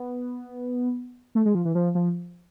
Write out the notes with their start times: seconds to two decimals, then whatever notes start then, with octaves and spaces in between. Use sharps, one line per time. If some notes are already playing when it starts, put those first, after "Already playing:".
Already playing: B3
1.35 A3
1.45 G#3
1.55 F3
1.65 E3
1.75 F3
1.95 F3